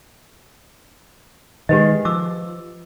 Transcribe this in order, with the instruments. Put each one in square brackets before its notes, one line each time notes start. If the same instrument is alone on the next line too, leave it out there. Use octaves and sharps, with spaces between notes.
[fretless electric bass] D#3 E3 G#3 [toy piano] G4 B4 D#5
[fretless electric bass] F3 [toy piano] D6 E6